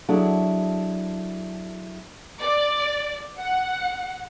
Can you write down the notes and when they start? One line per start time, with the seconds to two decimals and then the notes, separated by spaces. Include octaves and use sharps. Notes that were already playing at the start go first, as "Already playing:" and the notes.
0.08 F#3 D4 E4 G#4 A4
2.40 D5
3.38 F#5